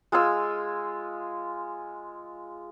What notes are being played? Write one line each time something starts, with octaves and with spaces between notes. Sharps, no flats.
G#3 F4 G#5 E6